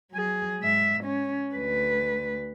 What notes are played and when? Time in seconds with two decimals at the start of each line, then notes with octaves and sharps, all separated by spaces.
0.12 F#3 G#4
0.60 G#2 E5
1.04 C#4
1.55 D2 B4